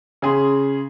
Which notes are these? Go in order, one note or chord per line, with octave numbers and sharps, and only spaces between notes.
C#3 G#4 C6